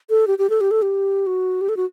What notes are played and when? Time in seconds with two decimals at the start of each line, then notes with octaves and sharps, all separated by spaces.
0.10 A4
0.27 G4
0.39 G4
0.50 A4
0.61 G4
0.71 A4
0.82 G4
1.27 F#4
1.61 G4
1.69 A4
1.77 F#4